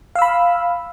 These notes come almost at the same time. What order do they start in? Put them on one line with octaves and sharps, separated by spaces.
F5 E6 B5